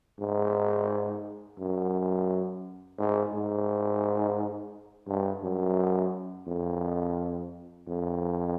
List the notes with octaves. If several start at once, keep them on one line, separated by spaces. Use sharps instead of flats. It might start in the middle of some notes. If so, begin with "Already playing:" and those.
G#2
F#2
G#2
G#2
G2
F#2
F2
F2